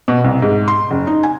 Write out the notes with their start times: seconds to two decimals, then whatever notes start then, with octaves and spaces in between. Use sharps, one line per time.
0.08 B2
0.24 C2
0.42 G#2
0.68 C6
0.91 F#1
1.07 D#4
1.23 G#5